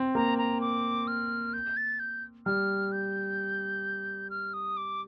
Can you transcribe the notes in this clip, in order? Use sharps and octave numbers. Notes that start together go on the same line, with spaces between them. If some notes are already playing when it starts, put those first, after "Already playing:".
Already playing: C4
A#3 A#5
A#5
D6
F6
G6
A6
G6
G3 F6
G6
F6
D#6
D6